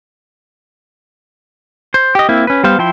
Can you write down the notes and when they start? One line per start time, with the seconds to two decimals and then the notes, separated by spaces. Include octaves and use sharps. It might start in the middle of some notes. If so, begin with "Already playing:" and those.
1.94 C5
2.15 G4 D#5
2.29 A#3 C4 E4
2.47 C#4 B4
2.64 G3 B3 C5 F5
2.79 F3 E4 G5 C6